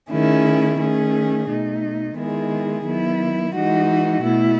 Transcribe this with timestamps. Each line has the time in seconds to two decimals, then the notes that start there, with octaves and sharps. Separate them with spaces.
0.11 D#3 A3 C#4 E4 G#4
0.79 D#3 A3 C#4 G#4
1.48 B2 A3 D#4
2.16 D#3 G#3 B3 E4 G#4
2.85 D#3 F#3 B3 E4
3.54 E3 G#3 D#4 F#4
4.23 B2 A3 E4